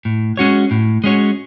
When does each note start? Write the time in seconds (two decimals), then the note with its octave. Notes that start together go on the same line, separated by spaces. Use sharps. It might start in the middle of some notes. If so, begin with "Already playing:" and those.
0.05 A2
0.37 G#3 C#4 F#4 C#5
0.71 A2
1.04 G#3 C#4 F#4 C#5